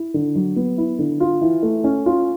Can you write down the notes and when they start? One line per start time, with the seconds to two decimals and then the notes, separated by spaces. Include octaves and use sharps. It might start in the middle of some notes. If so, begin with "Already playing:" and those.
Already playing: E4
0.14 D3
0.35 F#3
0.56 B3
0.78 E4
0.99 D3
1.20 F4
1.41 E3
1.63 A3
1.84 C#4
2.06 F4